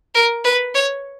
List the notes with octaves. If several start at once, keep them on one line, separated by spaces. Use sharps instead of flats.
A#4
B4
C#5